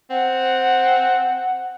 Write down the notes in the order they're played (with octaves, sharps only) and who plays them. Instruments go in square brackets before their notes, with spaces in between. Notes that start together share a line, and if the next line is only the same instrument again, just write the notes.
[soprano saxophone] C4 [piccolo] F#5